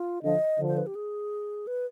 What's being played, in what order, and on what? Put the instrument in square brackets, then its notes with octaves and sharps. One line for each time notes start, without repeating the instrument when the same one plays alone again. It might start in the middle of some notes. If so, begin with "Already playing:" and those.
Already playing: [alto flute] F4
[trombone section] D3 F3 [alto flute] D#5
[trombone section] D3 F3
[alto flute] C5
B4
G4
G#4
B4